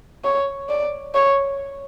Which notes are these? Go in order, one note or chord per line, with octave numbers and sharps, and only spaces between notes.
C#5
D5
C#5